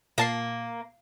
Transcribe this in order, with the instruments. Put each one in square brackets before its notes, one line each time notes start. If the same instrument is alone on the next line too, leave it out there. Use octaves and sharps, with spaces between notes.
[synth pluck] A#2 A5 C7 [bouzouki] A#3